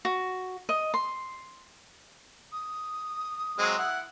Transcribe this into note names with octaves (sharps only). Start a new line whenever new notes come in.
F#4
D#5
C6
D#6
F#3 G#3 C4
E4 F#5